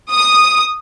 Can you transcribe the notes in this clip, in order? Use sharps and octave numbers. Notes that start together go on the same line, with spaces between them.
D#6